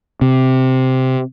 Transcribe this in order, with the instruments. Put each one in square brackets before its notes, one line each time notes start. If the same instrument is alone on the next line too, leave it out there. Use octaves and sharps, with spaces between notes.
[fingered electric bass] C3